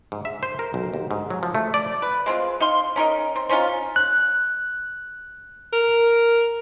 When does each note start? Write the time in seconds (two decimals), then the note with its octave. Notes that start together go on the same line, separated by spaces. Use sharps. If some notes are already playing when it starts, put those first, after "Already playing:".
0.12 G#2
0.25 E5
0.43 C5
0.59 A#4
0.74 B1
0.94 D#2
1.11 G#2
1.30 F#3
1.43 F3
1.55 A3
1.74 D5
2.02 B4
2.26 G#3 C4 F4
2.60 D#4 F5 C6
2.96 C#4 D#4 A#4 D#5
3.36 C4
3.49 C4 C#4 D#4 F4
3.96 F#6
5.73 A#4